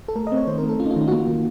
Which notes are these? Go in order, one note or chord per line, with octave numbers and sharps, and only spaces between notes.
A4
A3 A#4
D#5
C4
C#5
D#3 C5
A#4
A3
A4
C#4 F4
D#4
F4
D#3 D#4
F#4
A#3 F4
D#3